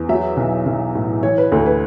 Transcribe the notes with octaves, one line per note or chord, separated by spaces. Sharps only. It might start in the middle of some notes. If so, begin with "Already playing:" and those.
Already playing: E2
F#3 E5
B1
B1
A2
E3 C#5
B4
D2 A4
B4